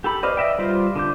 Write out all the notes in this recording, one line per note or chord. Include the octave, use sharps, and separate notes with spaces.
G4 A4 B5
B4 C5 D5 D#5 F5
D#5 E5 G5
G3 F4 C5
D3 D6 G6